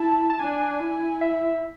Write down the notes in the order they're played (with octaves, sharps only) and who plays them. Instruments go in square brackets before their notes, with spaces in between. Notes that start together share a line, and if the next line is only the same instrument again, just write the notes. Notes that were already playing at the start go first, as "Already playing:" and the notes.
Already playing: [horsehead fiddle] E4 [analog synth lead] A5
[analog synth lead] A5
[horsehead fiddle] D4 [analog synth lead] G#5
[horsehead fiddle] E4
[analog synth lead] E5